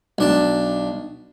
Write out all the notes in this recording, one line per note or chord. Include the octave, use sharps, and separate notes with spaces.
B1 D4 A5